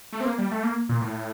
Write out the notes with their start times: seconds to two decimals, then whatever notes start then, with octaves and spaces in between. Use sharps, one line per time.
0.13 A3
0.20 C4
0.25 A#3
0.38 G3
0.51 A3
0.63 A#3
0.89 A#2
1.01 A2